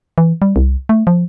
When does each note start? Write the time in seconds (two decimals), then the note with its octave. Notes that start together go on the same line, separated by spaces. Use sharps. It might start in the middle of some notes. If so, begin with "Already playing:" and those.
0.18 E3
0.42 G3
0.56 C2
0.89 A3
1.07 F3